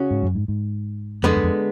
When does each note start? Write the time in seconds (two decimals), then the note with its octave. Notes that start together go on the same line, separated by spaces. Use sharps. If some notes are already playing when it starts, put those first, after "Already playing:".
Already playing: C#3 C#4 F#4
0.11 G#2
0.23 F#2
0.35 G#2
0.48 G#2
1.23 F2 D3 G#3 B3
1.36 F#2
1.43 F2